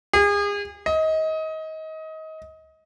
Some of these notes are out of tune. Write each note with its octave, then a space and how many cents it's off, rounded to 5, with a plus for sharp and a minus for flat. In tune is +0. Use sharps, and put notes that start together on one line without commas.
G#4 -35
D#5 +25